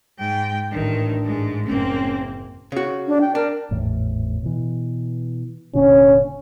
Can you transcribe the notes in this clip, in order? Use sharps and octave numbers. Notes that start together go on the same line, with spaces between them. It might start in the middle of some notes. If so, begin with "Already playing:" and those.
G#2 G5
A1 D#3 D4
G#2 G#3
F#1 A#3 C4 C#4
C#3 F#4
D4
G5
D4 A#4
G#1 E2 A2
B2 E3
F1 A#2 D3 C#4